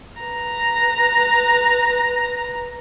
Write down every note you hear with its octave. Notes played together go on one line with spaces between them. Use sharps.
B4 A#5